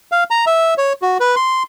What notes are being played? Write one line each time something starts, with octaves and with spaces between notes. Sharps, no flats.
F5
A#5
E5
C#5
F#4
B4
C6